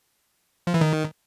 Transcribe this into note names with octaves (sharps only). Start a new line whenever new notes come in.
F3
E3
D#3